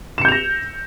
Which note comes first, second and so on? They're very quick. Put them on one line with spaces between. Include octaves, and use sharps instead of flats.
E7 C#7 G6 F7 A#6